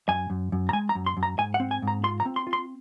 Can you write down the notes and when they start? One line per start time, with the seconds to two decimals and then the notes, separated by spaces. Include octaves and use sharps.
0.08 F#2 G#5
0.30 F#2
0.52 F#2
0.69 A#5
0.73 G#3 G#5
0.89 A#5
0.95 F#2
1.06 C6
1.17 F#2
1.23 A#5
1.38 G#2 G#5
1.54 F#5
1.60 C4
1.71 G#5
1.82 G#2
1.88 A#5
2.04 F4 C6
2.20 A#5
2.25 C4
2.36 C6
2.47 F4
2.53 C6